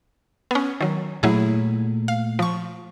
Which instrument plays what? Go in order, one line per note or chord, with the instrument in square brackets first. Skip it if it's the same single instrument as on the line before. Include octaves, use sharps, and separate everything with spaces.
[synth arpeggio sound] B3 C#4
D#3 F#3
[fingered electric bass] A#2 A3 [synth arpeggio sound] F#3 E4 G#4
[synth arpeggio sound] F5
F3 C#6